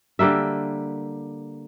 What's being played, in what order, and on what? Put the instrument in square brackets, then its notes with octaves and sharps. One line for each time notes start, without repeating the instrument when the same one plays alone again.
[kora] D3 G3 A#3 E5